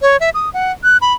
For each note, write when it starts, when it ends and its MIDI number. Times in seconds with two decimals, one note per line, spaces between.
0.02 0.17 73
0.20 0.30 76
0.34 0.49 87
0.54 0.72 78
0.84 0.97 90
1.02 1.13 83